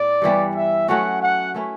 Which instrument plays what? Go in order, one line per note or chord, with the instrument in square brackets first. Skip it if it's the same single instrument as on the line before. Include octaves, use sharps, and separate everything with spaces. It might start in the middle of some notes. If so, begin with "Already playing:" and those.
Already playing: [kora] A2 B3 [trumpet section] D5
[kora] G2 E3 G3 B3
[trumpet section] E5
[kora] F#3 A3 C#4 F#4 [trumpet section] F#5
[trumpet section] F#5
[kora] A3 C#4 E4 B4